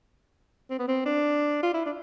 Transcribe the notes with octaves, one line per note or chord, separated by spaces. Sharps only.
C4
B3
C4
D4
F4
E4
D4